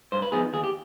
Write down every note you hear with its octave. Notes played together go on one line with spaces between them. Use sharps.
G2 C5
B4
F3 B3 D#4 G#4
D#2 G#4
G4